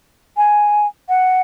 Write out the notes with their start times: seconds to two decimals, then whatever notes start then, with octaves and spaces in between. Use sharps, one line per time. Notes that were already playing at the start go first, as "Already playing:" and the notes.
0.37 G#5
1.09 F#5